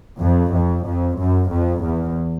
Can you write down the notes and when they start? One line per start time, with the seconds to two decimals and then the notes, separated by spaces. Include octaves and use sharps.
0.20 F2
0.53 F2
0.86 F2
1.19 F#2
1.51 F2
1.85 E2